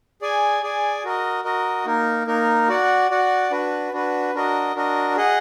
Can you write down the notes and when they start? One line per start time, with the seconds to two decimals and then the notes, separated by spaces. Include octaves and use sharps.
0.22 G#4 D5 G#5
0.63 G#4 D5 G#5
1.04 F#4 A#4 D#5
1.44 F#4 A#4 D#5
1.86 A#3 D#4 A#4
2.27 A#3 D#4 A#4
2.68 F#4 D5 F#5
3.10 F#4 D5 F#5
3.51 D4 F#4 B4
3.92 D4 F#4 B4
4.34 D4 F#4 A#4 D#5
4.75 D4 F#4 A#4 D#5
5.17 G#4 D#5 F#5